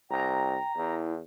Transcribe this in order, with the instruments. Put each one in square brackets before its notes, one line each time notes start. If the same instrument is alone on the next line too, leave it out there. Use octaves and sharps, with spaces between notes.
[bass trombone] C2 [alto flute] G5 [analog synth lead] A#5
[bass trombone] E2 [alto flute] E4